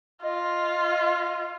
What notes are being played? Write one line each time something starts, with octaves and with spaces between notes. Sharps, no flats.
F4 D#5